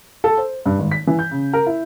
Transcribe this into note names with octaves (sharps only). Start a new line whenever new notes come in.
A4
C5
G2
G#1
B6
E3
G6
C#3
A#4
E4